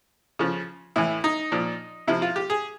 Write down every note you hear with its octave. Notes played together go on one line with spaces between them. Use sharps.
C#3 F3
A2 E3 E4
D#4
A#2 F3
C3 F3 E4
F4
G4
G#4